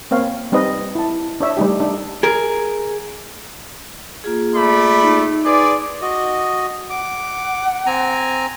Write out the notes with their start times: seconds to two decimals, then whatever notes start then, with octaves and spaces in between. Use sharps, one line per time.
0.11 A#3 C4 C#5 F5
0.52 G3 C4 D#4 B4 D#5
0.95 E4 A5
1.40 D4 C#5 E5
1.57 G3 A3 D#4 G4
1.80 D4 D#4
2.23 G#4 A#4
4.24 A#3 F4 G#4
4.56 A3 D5 B5
5.02 D#4
5.46 G#4 B4 D5 C6 D6
6.02 F#4 D#5
6.90 F#5 D6
7.86 C4 G#5 A#5